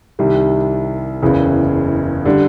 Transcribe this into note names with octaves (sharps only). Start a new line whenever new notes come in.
C2 C3 D#3 G3
F#1 E2 C#3
D3 G3